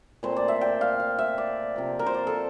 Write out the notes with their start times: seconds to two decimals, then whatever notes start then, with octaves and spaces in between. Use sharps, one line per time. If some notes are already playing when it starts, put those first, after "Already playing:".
0.23 A#2 A3 C4 C5
0.36 D5
0.48 E5
0.61 G5
0.81 F5
1.00 F5
1.19 E5
1.38 D5
1.76 C3 F3 A#3
1.99 A#4
2.06 C5
2.14 D5
2.27 A4